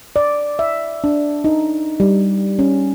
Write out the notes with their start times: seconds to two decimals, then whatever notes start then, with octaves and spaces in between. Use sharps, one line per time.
0.16 D5
0.59 E5
1.04 D4
1.44 D#4
2.00 G3
2.59 C#4